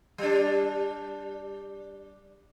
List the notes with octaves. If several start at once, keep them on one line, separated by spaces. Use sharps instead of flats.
G3 D4